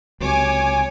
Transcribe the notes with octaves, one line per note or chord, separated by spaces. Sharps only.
C#2 C3 F#3 C#5 G#5 D6